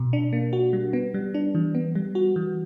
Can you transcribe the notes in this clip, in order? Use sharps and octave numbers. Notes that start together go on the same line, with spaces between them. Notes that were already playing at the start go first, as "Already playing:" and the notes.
Already playing: B2
D4
A#3
F#4
G3
B3
G3
D4
E3
B3
G3
F#4
E3